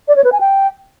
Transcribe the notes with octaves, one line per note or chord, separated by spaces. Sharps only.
D5
C#5
B4
G#5
G5